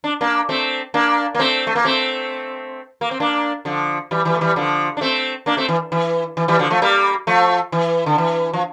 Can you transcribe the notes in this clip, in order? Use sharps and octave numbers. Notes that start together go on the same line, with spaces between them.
D4
A#3 D4
A3 C4
A#3 D4
A#3
A3 C4
A3
A#3
A3 C4
A#3
C4
A#3 D4
D3 F3
E3 G3
E3 G3
A3
E3 G3
D3 F3
D4
A3 C4
A#3 D4
A3 C4
E3
E3
E3
E3 G3
D3 F3
F3 A3
G3 A#3
F3 A3
E3
D3
E3
F3